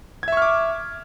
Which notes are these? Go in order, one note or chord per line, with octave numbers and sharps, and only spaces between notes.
E5 C#6 D6 F6 G#6